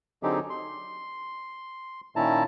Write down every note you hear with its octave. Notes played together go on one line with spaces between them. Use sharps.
D3 F#3 C4 D#4 G4 G#4
C6
A#2 D#3 C#4 E4 A5 A#5